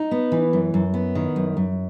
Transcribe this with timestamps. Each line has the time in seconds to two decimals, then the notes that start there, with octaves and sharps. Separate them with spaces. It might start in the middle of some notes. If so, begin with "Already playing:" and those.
Already playing: D#4
0.11 B3
0.32 E3
0.53 F#2
0.74 F#2
0.94 B3
1.15 D#3
1.36 F#2
1.57 F#2